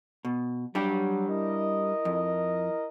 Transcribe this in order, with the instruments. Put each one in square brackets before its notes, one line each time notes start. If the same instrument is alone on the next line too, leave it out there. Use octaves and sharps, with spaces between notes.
[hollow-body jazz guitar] B2
[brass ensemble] F#3 [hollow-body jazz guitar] G3 D4 G4
[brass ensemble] E4 A#4 D#5
[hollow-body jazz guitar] F2